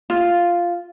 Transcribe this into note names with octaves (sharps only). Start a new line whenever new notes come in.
F4